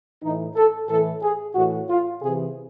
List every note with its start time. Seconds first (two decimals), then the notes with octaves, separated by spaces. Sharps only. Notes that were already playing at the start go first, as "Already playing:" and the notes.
0.23 A2 E3 D#4
0.56 A4
0.89 A2 E3 A4
1.23 G#4
1.55 A2 E3 F#4
1.89 F4
2.21 C3 E3 G#4